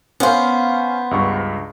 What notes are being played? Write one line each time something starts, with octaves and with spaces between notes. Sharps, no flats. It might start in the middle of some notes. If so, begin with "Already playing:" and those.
B3 C#4 C5 F5
C#2 G2 C#6